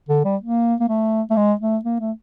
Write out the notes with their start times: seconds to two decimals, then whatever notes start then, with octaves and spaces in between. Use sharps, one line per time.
0.09 D3
0.25 G3
0.41 A#3
0.80 A#3
0.89 A3
1.30 A3
1.37 G#3
1.61 A3
1.85 A#3
2.00 A3